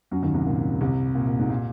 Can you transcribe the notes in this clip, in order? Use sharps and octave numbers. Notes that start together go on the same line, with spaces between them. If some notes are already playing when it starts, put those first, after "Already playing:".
F#2 F#3
D#2 D#3
C2 C3
A#2
C2 C3
A#2
A#2
G#2
A#2